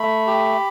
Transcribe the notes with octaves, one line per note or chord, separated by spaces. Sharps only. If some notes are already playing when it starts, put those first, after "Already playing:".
Already playing: A3 B5
G4